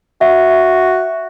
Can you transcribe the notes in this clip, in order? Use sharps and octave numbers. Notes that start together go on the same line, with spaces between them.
F#4 E5